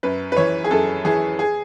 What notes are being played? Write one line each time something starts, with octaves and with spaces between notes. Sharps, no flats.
F#2 B4
B4
E3 C#5
G#4
F#2 A4
E3 G#4
G#4